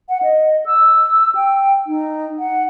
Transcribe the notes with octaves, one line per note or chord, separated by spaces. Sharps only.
F#5
D#5
E6
G5
D#4
F#5